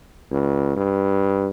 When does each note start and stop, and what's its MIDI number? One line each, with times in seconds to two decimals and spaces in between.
0.32 0.74 37
0.76 1.50 43